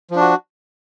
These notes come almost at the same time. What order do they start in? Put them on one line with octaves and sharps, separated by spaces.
F3 D4 F#4